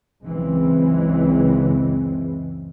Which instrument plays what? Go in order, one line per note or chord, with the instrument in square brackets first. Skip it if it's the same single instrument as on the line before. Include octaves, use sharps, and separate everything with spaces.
[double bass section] F#1 C#2 C#3 E3 G#3 C4